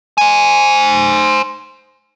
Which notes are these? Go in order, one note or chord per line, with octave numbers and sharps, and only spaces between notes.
C5 G#5